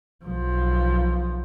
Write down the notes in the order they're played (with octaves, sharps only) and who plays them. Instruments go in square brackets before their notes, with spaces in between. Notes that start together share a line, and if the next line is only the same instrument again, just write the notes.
[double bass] B1 F3